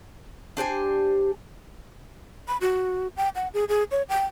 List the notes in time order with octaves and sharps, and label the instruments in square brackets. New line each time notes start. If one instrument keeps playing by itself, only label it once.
[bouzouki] D4 G4 C5 G#5
[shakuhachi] B5
F#4
G5
F#5
G#4
G#4
C#5
G5